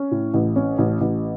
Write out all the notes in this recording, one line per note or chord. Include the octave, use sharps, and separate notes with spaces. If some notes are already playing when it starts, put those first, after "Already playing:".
Already playing: C#4
A2
A1
C#4
A1
A1